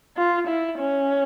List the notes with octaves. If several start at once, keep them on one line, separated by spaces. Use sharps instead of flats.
F4
E4
C#4